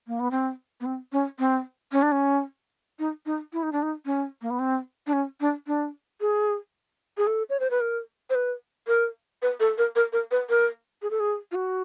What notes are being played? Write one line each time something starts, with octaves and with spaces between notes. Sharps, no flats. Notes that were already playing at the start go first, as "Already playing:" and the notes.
A#3
B3
C4
B3
C4
C#4
C4
C#4
D4
C#4
D#4
D#4
E4
D#4
D4
D#4
C#4
A#3
B3
C4
D4
C#4
D4
D4
G#4
G#4
A4
C#5
C5
B4
A#4
C5
B4
A#4
B4
A4
A#4
A#4
A#4
B4
A#4
G#4
A4
G#4
F4
F#4